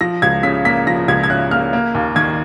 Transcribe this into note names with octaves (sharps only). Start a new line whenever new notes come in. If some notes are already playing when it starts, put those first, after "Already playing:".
F3 A#6
C#2 G#6
C#3 B6
A#3 B6
F3 A#6
C#2 G#6
G#6
C#3 F#6
A#3 F6
A#3
D#2
D#3 G#6